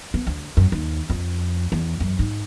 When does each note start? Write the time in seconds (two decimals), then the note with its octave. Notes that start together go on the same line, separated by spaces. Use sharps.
0.14 B3
0.27 D2
0.57 F#2
0.72 D#2
1.10 F2
1.72 E2
2.00 F#2
2.19 G#2